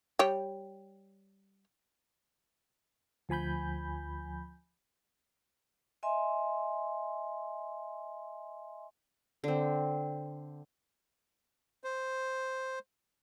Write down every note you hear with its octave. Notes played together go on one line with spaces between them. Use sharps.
G3 C#5 G5
D2 F3 G#5 B5 G6
D#5 E5 G#5 C6
D3 C4
C5